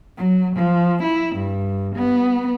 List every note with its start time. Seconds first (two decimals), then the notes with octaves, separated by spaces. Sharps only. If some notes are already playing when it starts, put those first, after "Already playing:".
0.17 F#3
0.56 F3
1.03 E4
1.36 G2
1.95 B3